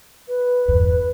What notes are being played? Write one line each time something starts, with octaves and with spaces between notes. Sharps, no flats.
B4
E2 G2